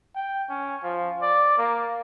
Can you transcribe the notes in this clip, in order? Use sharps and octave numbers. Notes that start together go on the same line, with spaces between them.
G5
C#4
F3
D5
A#3